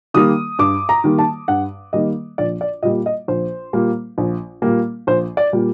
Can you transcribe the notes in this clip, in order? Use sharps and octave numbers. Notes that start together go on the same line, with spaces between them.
D#3 G3 A#3 D#6
G2 D6
A#5
D#3 G3 A#3
A5
G2 F#5
D#3 G3 A#3 D#5
A#1 D5
D5
A#2 G3 A#3 D#5
D#5
A#1 C5
A#2 G3 A#3
A#1
A#2 G3 A#3
A#1 C5
D5
A#2 G3 A#3